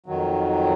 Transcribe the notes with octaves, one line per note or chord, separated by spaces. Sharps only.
F2 D#3 F#3